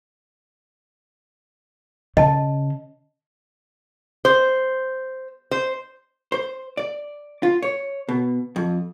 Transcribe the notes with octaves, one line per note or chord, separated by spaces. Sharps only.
C#3 D#5 A5
C5
C5
C5
D5
F4
C#5
B2
F2